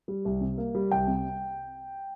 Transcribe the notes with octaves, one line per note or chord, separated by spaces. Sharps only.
G3
C2
C3
A#3
G3
C2 G5
C3